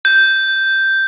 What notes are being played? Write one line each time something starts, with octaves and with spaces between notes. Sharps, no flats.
G6